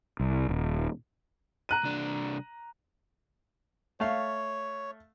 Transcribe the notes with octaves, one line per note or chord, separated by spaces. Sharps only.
C2
D#1
A#5 F#6 D#7
C2 D4
A3 C#5 F5